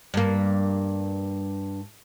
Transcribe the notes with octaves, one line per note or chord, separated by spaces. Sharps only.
G2 A#3